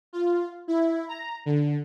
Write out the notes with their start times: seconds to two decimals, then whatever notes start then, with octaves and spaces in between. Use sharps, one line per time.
0.13 F4
0.68 E4
1.08 A#5
1.46 D3